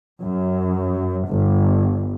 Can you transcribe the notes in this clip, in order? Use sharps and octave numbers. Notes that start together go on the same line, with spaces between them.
F#2
G1